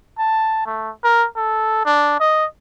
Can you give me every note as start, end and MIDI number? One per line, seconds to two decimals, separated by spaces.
0.19 0.64 81
0.66 0.90 57
1.04 1.26 70
1.36 1.80 69
1.85 2.19 62
2.20 2.46 75